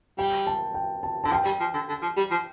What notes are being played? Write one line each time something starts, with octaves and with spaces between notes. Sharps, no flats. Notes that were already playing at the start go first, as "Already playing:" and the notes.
G3 G5
A5
G5
A5
D3 A5
F3 G5
G3
F3
D3
D3
F3
G3
F3